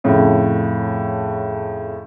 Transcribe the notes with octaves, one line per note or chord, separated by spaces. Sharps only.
F2 A2 C#3